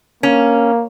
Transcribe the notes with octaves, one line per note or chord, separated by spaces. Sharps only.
A#3 C#4